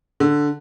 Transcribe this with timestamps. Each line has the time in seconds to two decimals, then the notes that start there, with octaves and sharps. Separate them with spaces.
0.20 D3